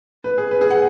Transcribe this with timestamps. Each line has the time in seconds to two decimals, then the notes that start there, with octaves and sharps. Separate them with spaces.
0.24 B4
0.38 G#4
0.51 B4
0.61 G#4
0.70 F#5